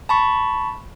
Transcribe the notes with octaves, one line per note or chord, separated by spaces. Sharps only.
A5 B5 C#6